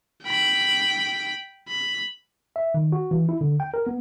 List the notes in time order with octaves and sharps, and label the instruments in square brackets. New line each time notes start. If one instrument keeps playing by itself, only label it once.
[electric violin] G5 B5
B5
[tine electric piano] E5
D#3
F#4
E3
E4
D3
G5
A#4
B3